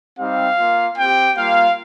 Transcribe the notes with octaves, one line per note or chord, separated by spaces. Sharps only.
G3 C4 D#4 G4 F5
A#3 F4
C4 G4 G5
G3 A#3 F4 F5